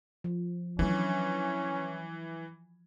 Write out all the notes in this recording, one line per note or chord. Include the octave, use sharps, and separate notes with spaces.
F3
E3 F#3 C#4 D4